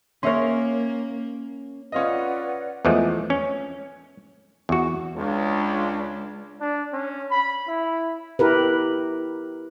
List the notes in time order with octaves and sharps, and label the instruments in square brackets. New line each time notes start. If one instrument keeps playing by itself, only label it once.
[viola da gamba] A#3 [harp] C#4 A#4 [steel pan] C#5 E5 C6
[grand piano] C#4 F4 D#5 [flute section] B4 D5 F#5
[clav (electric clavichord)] E2 E3 F3 G#3 A3
C#4
E2 F#4
[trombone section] C#2 [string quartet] G#3 D4
[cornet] D4
C#4
B5
E4
[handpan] E4 G4 A#4 B4